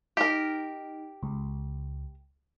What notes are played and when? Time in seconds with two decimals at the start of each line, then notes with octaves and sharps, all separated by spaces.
0.17 D#4 G4 A#4
1.23 C#2